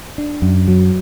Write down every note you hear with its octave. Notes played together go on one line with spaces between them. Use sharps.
D4
F#2
F#3